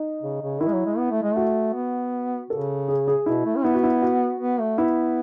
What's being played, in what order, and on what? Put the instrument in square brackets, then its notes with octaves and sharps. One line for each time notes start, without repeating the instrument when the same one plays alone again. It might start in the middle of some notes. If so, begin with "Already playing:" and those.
Already playing: [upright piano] D#4
[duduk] C#3
C#3
[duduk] D#3 [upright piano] E4
[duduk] G#3
F#3
G#3
B3
A3
G#3
[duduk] A3 [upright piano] F#4
[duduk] B3
[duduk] C#3 [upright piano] A4
[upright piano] G#4
G#4
[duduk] B2 [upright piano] E4
[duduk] A3
C#4
[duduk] B3 [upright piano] E4
[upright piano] F#4
E4
F#4
[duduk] B3
A3
[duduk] B3 [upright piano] E4